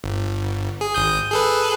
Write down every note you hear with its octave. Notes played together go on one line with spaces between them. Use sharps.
G1
G#4
G#1 D#6 G6
G#4 A4 B4